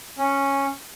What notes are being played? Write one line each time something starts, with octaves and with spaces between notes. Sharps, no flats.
C#4